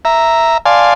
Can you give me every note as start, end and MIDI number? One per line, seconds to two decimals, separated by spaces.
0.05 0.58 76
0.05 0.58 82
0.65 0.94 74
0.65 0.94 77
0.65 0.94 80
0.65 0.94 81
0.65 0.94 84